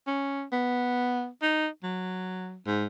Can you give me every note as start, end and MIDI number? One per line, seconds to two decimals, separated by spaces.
0.07 0.43 61
0.52 1.27 59
1.42 1.68 63
1.83 2.57 54
2.67 2.85 44